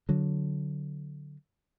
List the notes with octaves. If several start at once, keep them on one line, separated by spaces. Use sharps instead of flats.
D3 F#3